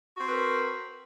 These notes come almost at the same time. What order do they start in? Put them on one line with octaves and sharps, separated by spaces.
F#4 C4 B4 A#4